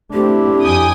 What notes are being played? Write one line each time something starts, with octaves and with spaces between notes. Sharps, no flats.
A3 C4 D4 E4 G4
F2 G5 G#5 D#6